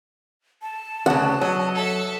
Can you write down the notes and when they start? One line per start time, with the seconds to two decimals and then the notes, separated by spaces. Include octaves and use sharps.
0.62 A5
1.06 D2 C#3 F#5
1.41 F#3 D#5
1.75 A4 E5